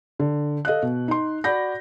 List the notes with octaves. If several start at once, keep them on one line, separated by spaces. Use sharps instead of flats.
D3
A4 D#5 F5 F#6
B2
D#4 C6
F#4 D5 F#5 B5 G6 A#6